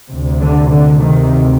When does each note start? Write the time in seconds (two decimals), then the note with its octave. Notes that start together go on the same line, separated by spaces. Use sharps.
0.10 D2 C3
0.40 D3
0.70 D3
0.99 D2 C3 D#3